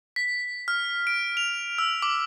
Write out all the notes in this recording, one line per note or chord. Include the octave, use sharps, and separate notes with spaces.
B6
F6
D7
F7
E6
D6